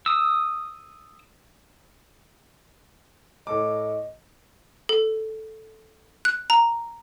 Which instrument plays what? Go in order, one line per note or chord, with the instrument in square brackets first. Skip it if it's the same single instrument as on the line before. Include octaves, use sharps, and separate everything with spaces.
[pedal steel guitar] D#6 E6
[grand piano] A2 A4 D6 [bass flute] D#5
[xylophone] A4
F#6
A#5